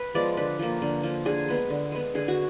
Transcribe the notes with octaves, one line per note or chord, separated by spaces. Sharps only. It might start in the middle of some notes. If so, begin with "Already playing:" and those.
Already playing: B4
F3 G#3 B3 D5
D3 B4
F3 A#3
D3
F3 A#3
D3 G#4
G#3 B3
D3
G#3 B3
D3 G#4
F#4